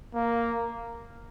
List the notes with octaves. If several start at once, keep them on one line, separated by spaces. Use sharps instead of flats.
A#3